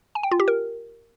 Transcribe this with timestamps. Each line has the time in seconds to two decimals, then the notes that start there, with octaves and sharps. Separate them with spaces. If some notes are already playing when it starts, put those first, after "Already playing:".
0.15 G#5
0.23 G5
0.31 F4
0.40 G4
0.48 A#4